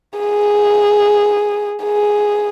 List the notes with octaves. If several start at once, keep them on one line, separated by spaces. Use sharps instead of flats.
G#4
G#4